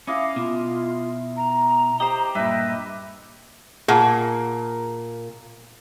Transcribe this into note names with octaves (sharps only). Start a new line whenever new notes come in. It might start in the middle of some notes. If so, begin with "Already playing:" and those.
C#4 E4 D#5 F5 D6
B2 F4
A#5
G4 C5 D#5
G2 A#2 B4 D#5 E5
A#2 G#4 F#5 A5